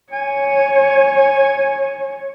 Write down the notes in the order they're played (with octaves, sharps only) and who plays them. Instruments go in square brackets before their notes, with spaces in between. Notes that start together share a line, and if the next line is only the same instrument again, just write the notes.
[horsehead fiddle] C#5 [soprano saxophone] G#5